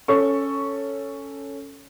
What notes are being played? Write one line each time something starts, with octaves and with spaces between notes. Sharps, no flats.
C#4 A4 C#6